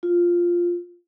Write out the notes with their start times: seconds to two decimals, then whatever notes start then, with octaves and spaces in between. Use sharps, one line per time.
0.03 F4